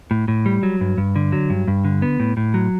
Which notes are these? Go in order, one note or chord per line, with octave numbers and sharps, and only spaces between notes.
A2
A2
G3
F#3
G2
G2
D3
F#3
G2
G2
D3
B3
A2
A2
F#3